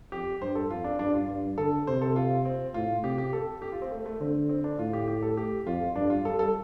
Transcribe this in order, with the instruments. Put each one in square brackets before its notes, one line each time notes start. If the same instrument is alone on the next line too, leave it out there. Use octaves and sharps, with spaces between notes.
[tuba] F2 [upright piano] G4
[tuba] G2 [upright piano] C5
[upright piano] A4
[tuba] F2 [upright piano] F4
[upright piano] D4
[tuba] G2 [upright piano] D4
[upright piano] F4
[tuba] G2
[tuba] D3 [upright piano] A4
[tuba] C3 [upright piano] C5
[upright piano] A4
F4
C4
[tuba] A2 [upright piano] F4
[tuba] C3 [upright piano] G4
[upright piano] G4
A4
G4
F4
C4
A3
A3
[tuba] D3 [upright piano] C4
[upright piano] C4
D4
[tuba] A2 [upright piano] F4
[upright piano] G4
G4
A4
G4
[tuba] F2 [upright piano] F4
[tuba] G2 [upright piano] D4
[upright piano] F4
[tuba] G3 [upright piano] A4
[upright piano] A4